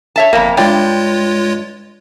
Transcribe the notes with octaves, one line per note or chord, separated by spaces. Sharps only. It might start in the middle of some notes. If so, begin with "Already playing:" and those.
C#5 E5 A5
G1 F2 A#3
G2 G#3 F4 C#5 D5 G5